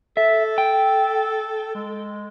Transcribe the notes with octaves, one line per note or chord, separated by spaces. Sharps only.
A4 E5
G5
G#3